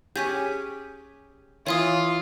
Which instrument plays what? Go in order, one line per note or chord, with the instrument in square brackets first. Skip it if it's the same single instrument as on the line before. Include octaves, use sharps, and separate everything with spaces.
[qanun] C#4 G4 G#4 [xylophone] G6 B6 D#7
[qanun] E3 [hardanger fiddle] F4 [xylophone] C#5 F5 D#6